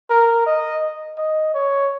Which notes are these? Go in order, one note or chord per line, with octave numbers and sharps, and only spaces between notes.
A#4
D#5
D#5
C#5